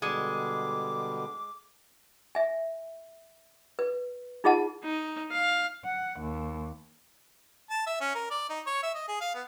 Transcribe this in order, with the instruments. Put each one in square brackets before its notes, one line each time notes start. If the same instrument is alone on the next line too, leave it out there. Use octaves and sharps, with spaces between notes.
[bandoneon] B2 D3 G3 [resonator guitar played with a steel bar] G#3 [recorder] D6
[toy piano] E5 G#5
B4
D#4 F4 G#4 D#5 F#5 A5
[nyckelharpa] D#4
F5
[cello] F#5
D#2
[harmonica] A5
E5
C#4
A#4
D5
D#4
C#5
E5
D#5
G#4
F5
B3